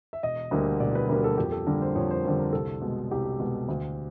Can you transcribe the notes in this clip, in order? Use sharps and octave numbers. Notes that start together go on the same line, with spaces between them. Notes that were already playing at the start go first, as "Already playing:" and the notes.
E5
E1 D#5
D2 D3 G3 A#3
E1 D5
B4
D2 D3 G3 A#3 A#4
A4
F2 G4
A4
D3 G3 A#3 A#4
C5
F2 C#5
C5
D3 G3 A#3 C5
A#4
C2 A4
B2 G#3
C2 G4
B2 G#3
D2